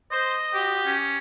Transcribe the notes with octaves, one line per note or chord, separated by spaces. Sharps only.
C5 D#5
F#4 G4
C#4